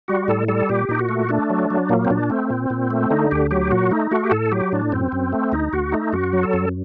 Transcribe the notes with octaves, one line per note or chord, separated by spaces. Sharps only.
G3 F#4
A2 A4
G3 A4
A#2 G4
A#2 D#4
F#4
A3
A3 D4
F#3
F#3
A#2 A#3
C4
A#2 D4
A3 C4
A#2
A#2
A3
D3 D#4
D2 G4
F#3 G4
A#2 F#4
A3 D#4
A3 F#4
G4
A2 A4
F#3 G4
A2 D4
F#2 C4
F#2
A3
D2 D#4
D2 F#4
A3 D#4
F#2 F#4
F#3
A4
F#2